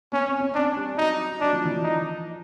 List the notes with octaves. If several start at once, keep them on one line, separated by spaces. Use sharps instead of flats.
B3 C#4
C4
C#4
C4 D4
G3
F#3 D#4
F#3 D4
F3
E3
F3
D#4